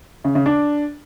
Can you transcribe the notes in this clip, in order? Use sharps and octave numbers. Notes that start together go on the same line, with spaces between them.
C#3
C#3
D4